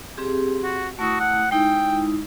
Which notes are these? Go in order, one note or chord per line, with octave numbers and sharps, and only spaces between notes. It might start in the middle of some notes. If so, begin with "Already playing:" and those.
C4 G4 G#4
F#4
A3 E4 F#4 D#6
F#5
G#3 D#4 E4 G5